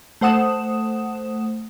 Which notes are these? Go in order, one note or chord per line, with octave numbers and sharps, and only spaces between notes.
A3 C5 F#5 D#6 E7